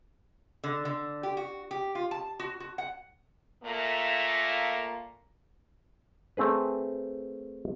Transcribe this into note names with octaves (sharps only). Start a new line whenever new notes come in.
D3
D3
G4
F#4
G4
F4
A5
F#4
F#4
F#5
A#2 A3 A#3
A3 C4 G#4 B4